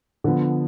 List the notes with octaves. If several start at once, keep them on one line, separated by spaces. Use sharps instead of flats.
D3 F3 B3